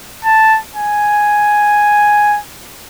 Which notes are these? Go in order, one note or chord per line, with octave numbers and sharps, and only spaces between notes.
A5
G#5